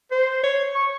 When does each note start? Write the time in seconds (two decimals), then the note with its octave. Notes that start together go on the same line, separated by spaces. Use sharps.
0.11 C5
0.43 C#5
0.75 C#6